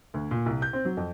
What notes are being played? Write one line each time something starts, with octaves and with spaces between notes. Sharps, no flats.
D2
A#2
C2
G6
C4
F#3
F2